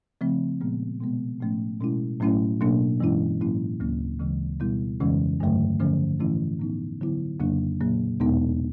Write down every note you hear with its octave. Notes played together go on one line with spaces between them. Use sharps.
C#3 F3 A3 C4
A#2 F3 G#3 B3
B2 G#3 B3
A2 F3 A3 C#4
B2 G#3 C#4 E4
A2 F#3 A3 C#4 E4
B2 F#3 A#3 D4
G2 E3 G#3 C#4 E4
A2 F#3 A#3 C#4 E4
D2 C#3 F#3 A#3 C#4
D2 C#3 E3 G#3
B2 G3 B3 E4
F2 C#3 E3 G#3 C#4
G2 D3 F#3 A3
G2 D3 F3 A3 C#4
A2 E3 A3 C#4 E4
A2 F#3 B3 D#4
D3 F#3 B3 E4
F2 C#3 F#3 A#3 D4
A#2 F#3 A#3
E2 B2 G#3 B3 D#4